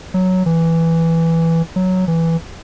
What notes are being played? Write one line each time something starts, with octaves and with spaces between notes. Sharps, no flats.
F#3
E3
F#3
E3